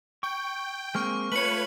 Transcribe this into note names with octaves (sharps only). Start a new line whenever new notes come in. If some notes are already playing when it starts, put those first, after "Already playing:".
G5 C#6
G#3 A#3 C4 C#6 F6
A3 F4 B4 C#5 C#7 F#7